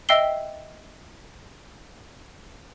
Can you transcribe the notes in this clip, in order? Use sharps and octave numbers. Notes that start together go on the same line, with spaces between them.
D#5 E5 G5 E6 C7 G7